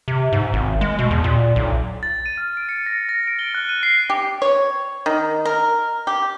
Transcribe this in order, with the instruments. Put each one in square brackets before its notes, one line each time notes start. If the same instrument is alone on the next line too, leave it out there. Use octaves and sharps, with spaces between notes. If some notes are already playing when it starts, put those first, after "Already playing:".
[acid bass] C3
G#2
G#1
G#3
B2
E2
A#2
B1
[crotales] A6
D#7
F6
D7
C#7
A#6
A#6
D7
G7
F#6
D#7
C7
[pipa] G4
C#5
D#3
A#4
G4